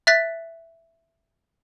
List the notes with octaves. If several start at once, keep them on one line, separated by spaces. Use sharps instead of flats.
E5 F#6 A6 B6